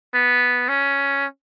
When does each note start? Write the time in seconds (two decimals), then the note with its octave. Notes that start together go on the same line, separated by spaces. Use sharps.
0.14 B3
0.69 C#4